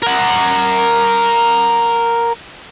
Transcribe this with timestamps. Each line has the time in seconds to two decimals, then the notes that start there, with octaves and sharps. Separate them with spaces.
0.02 A#4 F#5